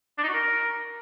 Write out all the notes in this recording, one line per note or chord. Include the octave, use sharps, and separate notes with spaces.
D4
D#4
F#4
A#4